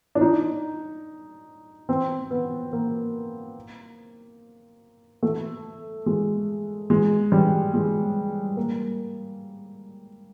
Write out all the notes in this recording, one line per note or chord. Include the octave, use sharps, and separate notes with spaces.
D4
D#4
C4
B3
A#3
A3
G#3
G#3
G3
G#3
A#3